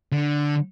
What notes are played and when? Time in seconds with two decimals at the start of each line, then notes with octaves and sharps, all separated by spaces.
0.12 D3